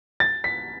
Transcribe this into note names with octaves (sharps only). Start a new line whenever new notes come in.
A6
B6